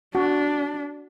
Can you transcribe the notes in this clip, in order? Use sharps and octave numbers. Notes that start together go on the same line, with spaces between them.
D4 F#4